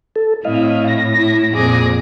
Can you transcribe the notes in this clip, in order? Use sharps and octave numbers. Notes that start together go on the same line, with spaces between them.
A4
A2 C4 E4 D#5 F5
A#6
E4
F2 A#2 G#4 D6